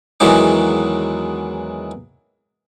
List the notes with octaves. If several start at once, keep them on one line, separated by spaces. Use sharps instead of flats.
E2 D#3 E3 F#3 G#3 D6